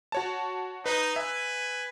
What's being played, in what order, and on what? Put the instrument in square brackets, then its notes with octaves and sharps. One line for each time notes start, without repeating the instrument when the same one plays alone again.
[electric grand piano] F#4 C#5 A5
[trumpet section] D#4 [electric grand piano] B4
[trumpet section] B4 G#5 [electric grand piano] E5